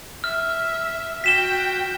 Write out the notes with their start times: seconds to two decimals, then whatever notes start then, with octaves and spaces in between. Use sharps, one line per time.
0.24 E5 F6
1.24 F#4 G5 B6 E7 G7